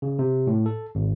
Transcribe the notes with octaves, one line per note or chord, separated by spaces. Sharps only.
C#3
C3
A2
A4
G#1